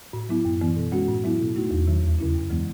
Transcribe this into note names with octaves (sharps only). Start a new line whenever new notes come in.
A2
F#3 B3 E4
F#2
E3 B3
B2
G#3 C#4 F#4
A2
F#3 B3 E4
B2
A3 D#4 F#4
E2
D#3 F#3
D#2
C#3 F#3 C#4 E4
F#2
E3 G#3 B3